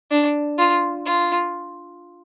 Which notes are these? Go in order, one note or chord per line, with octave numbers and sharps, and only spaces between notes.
D4
F4
F4